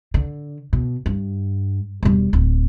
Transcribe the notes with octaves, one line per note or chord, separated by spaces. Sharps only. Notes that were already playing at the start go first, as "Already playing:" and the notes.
D3
B2
G2
E1 G3
D1